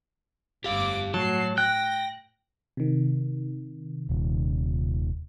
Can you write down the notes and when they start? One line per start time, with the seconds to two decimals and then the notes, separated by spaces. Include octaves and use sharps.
0.64 G1 G4 F5 D6
1.14 A2 F#3 F#4 A5 C7
1.58 G5 F#6 A#6
2.77 C3 D#3
4.09 D#1